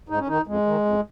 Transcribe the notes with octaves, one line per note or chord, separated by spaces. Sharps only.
G#2 D#4
C#4
D#3 D#4
F2 G#3
D#3
F2